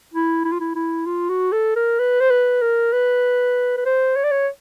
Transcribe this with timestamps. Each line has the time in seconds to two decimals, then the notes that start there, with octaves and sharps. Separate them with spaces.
0.14 E4
0.44 E4
0.52 F4
0.60 E4
0.75 E4
1.06 F4
1.29 F#4
1.52 A4
1.76 A#4
1.99 B4
2.20 C5
2.30 B4
2.61 A#4
2.92 B4
3.77 B4
3.85 C5
4.16 C#5
4.23 D5
4.31 C#5